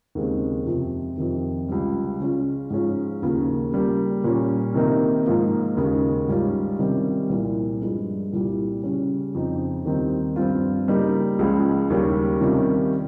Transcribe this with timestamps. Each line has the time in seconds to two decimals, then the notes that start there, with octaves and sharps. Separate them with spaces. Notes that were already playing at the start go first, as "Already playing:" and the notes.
0.15 D#2 C#3 G#3 C4
0.66 F2 C3 F3 C4
1.18 F2 C3 D#3
1.68 C#2 C#3 G3
2.20 C#3 G#3 C#4 F4
2.70 G#2 F3 G#3 C#4 F4
3.22 D#2 C#3 F3 A#3
3.72 C#3 G3 A#3
4.24 A#2 G3 C#4
4.74 C3 D#3 A#3 D#4
5.26 G#2 F3 A#3 F4
5.77 D#2 C#3 G#3
6.28 G#2 G3 C#4 F4
6.79 C3 D#3 G3 C#4
7.30 C2 A#2 F3 A#3
7.81 G2 F3 G#3
8.33 C2 A#2 G3
8.83 C#3 G3 C#4
9.34 F2 C#3 F3 C4 D#4
9.85 D#2 D#3 G3 C4 D#4
10.36 G2 F3 C4 F4
10.88 C#3 G3 A#3 D#4
11.39 C#2 C#3 F3 G#3
11.90 D#2 C#3 G3 C#4
12.41 C3 D#3 G3 C#4 F4